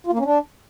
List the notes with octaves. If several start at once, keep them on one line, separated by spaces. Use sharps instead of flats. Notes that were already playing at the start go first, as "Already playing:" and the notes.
F4
A#3
C#4
D4